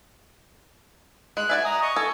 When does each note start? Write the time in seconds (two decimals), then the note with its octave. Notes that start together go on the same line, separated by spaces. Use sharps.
1.37 G#3 F#6
1.49 F#4 D5 E5 G#5
1.65 A#5 D#6
1.82 D#5 C#6
1.96 A4 G#5